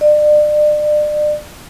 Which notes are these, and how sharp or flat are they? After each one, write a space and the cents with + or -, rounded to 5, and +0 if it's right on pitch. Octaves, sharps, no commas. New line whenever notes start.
D5 +35